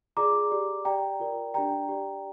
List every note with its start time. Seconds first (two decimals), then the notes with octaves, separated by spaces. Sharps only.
0.17 F4 G#4 D5 A#5 D6
0.51 G4 D5
0.85 G4 D5 G5 A#5
1.20 F4 A#4 D5
1.54 D4 G4 D5 G5 A#5
1.89 G4 D5